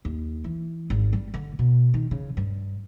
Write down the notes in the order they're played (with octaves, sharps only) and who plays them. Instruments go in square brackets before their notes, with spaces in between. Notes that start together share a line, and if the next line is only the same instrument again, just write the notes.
[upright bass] D#2
E3
G#1
G3
D3
B2
D#3
C#3
G2